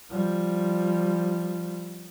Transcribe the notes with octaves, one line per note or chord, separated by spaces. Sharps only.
F3 G3